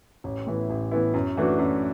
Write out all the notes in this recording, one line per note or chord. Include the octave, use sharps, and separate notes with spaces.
A1
A2 E3 B3 E4
A1
A2 E3 B3 E4
F#2
E3 A3 D4 F#4
F#2